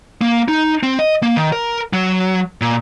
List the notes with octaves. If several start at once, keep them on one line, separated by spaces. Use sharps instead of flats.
A#3
D#4
C4
D#5
A#3
D#3
A#4
F#3
A#2